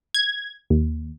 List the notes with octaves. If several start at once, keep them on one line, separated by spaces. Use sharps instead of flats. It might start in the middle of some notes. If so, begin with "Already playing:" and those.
G#6
D#2